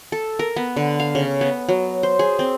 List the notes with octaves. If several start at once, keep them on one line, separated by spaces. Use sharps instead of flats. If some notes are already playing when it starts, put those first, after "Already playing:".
A4
A#4
B3
D3
F5
C#3
B3
F#3
C5
G#4
C4